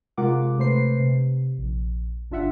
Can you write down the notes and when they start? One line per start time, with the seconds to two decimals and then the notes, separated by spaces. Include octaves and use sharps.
0.17 C3 G#3 F4 A#4 F#5 D6
0.58 C3 A3 B4 C5 C7
1.00 C3
1.58 A#1
2.31 G1 D4 F4 E5 F#5